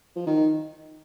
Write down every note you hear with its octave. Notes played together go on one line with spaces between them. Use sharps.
F3
D#3